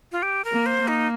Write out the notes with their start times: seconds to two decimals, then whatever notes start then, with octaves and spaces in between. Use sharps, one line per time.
0.12 F4
0.23 G4
0.45 A#4
0.52 A#3
0.66 C5
0.81 A#3
0.88 D#4